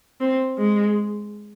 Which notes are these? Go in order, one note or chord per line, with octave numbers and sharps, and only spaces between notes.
C4
G#3